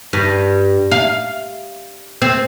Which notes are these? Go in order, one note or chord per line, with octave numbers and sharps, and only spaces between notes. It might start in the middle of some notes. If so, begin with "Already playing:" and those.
G2
F5
C4